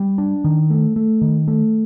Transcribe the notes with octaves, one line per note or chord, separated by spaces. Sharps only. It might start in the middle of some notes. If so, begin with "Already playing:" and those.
Already playing: G3
D4
D#3
A3
A3
D#3
A3